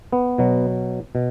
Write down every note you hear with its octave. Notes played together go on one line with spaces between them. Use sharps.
B3
B2 F#3
B2